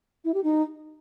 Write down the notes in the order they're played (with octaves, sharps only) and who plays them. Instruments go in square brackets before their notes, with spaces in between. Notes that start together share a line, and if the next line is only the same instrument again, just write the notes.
[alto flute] E4
G4
D#4